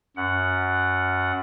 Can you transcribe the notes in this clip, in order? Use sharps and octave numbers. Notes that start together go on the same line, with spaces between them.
F#2 F#5